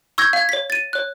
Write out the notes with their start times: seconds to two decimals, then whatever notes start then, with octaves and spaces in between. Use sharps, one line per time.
0.18 C#6 E6 G6 G#6 A#6
0.33 F5 G#6
0.49 C#5 B6
0.70 A6 D#7
0.93 C#5 F#6